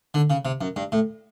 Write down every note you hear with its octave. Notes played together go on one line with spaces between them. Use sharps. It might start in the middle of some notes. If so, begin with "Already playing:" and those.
D3
C#3
C3
F#2
G2
A2